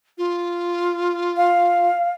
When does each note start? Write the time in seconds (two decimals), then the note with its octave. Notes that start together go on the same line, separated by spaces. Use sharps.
0.18 F4
1.37 F5